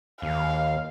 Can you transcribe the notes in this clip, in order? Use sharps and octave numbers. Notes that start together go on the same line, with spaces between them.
D#2 F5